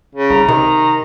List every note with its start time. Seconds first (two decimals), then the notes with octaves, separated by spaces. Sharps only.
0.15 C#3
0.30 C2 A#5
0.48 C3 D#3